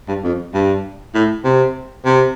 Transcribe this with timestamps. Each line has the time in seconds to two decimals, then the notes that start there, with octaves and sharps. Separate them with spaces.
0.08 G2
0.24 F2
0.54 G2
1.15 A2
1.44 C3
2.05 C3